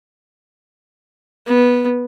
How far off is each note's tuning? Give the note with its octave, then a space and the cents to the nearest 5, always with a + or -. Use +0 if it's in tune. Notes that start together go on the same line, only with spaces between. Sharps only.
B3 -10